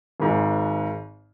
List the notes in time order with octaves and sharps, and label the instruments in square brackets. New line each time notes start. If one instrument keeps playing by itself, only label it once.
[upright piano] G#1 G#2 G#3